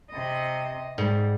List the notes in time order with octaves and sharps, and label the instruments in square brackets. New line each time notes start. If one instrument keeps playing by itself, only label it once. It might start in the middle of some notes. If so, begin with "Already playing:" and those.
[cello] C3 D#5
[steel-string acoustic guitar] G#2 [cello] G3